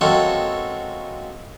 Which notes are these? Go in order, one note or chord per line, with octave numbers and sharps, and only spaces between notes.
G#3 A#3 C4 C#4 F#4 A4